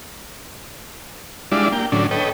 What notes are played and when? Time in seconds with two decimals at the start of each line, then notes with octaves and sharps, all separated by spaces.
1.52 G3 G#3 D4 E4 F4 D5
1.72 A#3 G5
1.92 A2 D3 F#3 C#4 D4
2.11 A4 B4 C#5 D#5 G5